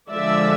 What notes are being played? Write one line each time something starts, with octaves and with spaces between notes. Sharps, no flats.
D3 F3 G#3 D5 E5